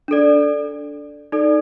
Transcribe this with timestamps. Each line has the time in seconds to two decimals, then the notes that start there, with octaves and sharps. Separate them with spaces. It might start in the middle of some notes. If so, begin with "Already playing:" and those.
0.08 D4 A4 D5
1.32 D#4 A4 D5